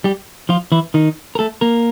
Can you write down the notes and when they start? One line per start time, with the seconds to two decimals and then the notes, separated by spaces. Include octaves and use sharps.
0.04 G3 G4
0.49 F3 F4
0.72 E3 E4
0.94 D#3 D#4
1.35 A#4
1.39 A3 A4
1.61 A#3 A#4